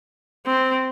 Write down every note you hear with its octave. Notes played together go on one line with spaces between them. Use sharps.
C4